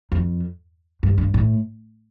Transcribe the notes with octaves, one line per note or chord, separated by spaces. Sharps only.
F2
G2
G2
A2